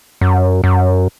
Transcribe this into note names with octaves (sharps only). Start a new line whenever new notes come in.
F#2
F#2